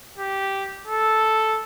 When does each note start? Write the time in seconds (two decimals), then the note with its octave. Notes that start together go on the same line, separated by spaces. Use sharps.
0.18 G4
0.87 A4